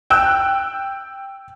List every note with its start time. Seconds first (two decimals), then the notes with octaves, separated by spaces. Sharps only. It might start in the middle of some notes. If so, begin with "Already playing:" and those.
0.10 G5 E6 F#6